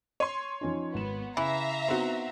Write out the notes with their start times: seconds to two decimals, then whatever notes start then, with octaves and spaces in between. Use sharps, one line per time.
0.20 C#5 C6 D#7
0.61 F3 C#4 D#4
0.94 G#1 B3 E7
1.37 C#3 E3 E5 F5 A#5
1.88 B3 C4 D#4 F#4